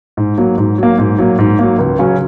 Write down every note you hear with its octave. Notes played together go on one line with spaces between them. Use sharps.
G#2
F#3 A#3
G#2
F#3 A#3
G#2
F#3 A#3
G#2
F#3 A#3
C#2
C#3 F#3 C#4